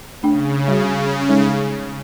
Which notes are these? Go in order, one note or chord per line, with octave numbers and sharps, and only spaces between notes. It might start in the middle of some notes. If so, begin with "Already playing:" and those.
C#3 A3 D4 G5
G3 F#4
G#3 D#4 A4